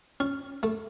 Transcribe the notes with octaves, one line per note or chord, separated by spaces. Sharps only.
C#4
A3